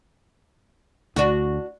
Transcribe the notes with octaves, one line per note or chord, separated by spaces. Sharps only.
D2 D4 F#4